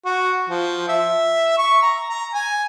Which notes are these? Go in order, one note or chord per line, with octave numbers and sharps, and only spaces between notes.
F#4
F3
E5
C#6
A#5
A#5
G#5